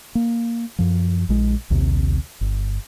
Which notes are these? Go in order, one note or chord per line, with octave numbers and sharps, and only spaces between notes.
A#3
F#2 F3
A#1 G#3
A#1 D#2 C3
G1